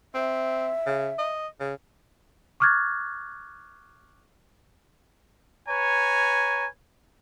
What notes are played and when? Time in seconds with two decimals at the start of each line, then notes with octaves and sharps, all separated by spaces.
0.14 C4 E5
0.86 C#3
1.18 D#5
1.60 C#3
2.60 C#6 D6 F6 F#6 G#6 A6
5.69 B4 C#5 G#5 A#5